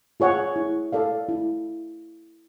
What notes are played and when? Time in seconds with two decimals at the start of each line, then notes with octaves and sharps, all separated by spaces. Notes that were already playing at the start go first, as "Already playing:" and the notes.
0.20 F4 G#4 C#5 F#5
0.56 E4
0.92 A4 D5 F5
1.29 E4